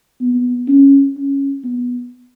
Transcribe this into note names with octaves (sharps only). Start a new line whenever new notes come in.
B3
C#4
C#4
B3